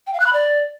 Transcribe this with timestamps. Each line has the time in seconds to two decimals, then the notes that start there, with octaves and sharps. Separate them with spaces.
0.07 G5
0.13 F5
0.20 F#6
0.26 B5
0.33 D5